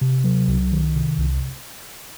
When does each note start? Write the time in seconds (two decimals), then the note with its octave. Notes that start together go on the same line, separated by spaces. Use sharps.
0.01 C3
0.24 F#3
0.48 C2
0.72 D#3
0.95 C3
1.18 C2